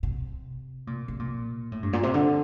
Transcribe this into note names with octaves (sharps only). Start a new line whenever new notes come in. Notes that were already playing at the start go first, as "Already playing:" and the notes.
C3
A#2
C3
A#2
A2
G2
A#2
C3
D3